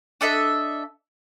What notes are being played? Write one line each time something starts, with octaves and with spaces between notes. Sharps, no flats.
D4 A4 D#5 E5